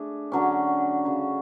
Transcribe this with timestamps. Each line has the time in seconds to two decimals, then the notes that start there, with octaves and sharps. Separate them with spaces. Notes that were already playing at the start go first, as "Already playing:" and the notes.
Already playing: A3 D4 G#4
0.32 D3 F#3 C#4
1.04 C#3 F#3 C#4